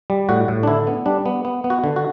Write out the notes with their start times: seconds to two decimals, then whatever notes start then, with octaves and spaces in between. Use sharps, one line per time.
0.10 G3
0.29 A2 F#4
0.48 A2
0.63 D4
0.67 D3 E4
0.87 B3
1.06 G3 D4
1.26 B3
1.45 B3
1.64 B3
1.70 F#4
1.84 D3
1.96 F#4